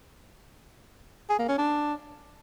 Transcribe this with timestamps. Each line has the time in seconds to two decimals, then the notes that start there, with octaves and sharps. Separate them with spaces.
1.29 G#4
1.39 A#3
1.48 C#4
1.58 D4